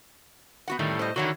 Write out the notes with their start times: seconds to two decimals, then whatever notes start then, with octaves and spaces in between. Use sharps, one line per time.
0.68 B3 F#4 F#5
0.79 A2 D#3 G3 A3
0.99 C5 D#5
1.16 D3 D#3 E4 F#4 C#5 F#5